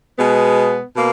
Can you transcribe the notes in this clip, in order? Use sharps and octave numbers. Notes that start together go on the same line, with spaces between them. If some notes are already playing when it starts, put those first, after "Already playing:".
B2 G#3 B3
B2 A#3